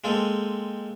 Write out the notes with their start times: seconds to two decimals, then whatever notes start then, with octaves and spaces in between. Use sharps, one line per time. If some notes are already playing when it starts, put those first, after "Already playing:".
0.04 G#3 A#3 C4 A4